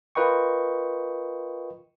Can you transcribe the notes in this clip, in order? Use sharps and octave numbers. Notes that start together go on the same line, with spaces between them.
F4 A#4 B4 D#5 G5 C#6